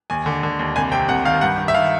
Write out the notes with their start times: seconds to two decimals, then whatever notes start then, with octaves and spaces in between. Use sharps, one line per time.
0.10 D#2 G#5
0.26 D3
0.43 D3
0.59 D#2
0.76 C2 G#5
0.92 C3 G5
1.09 C2 F#5
1.25 D#3 F5
1.41 G2 F#5
1.58 D#3
1.68 E5
1.74 D#3 F5